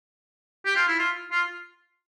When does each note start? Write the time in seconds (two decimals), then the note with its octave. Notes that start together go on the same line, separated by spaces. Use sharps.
0.65 G4
0.76 F4
0.88 E4
0.99 F4
1.32 F4